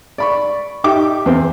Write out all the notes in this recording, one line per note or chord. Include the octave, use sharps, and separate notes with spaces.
D5 B5 C#6
D#4 G4 E5 G5 D6
E2 C4